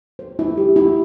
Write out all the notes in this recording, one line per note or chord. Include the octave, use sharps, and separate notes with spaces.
C5
E4
G4
E4